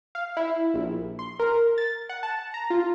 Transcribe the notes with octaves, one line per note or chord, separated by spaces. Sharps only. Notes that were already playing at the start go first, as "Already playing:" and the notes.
F5
E4
A#1
C6
A#4
A6
F#5
A5
A#5
F4